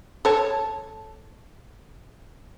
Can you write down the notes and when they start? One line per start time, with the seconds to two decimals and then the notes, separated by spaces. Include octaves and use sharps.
0.25 A4 C#5 A5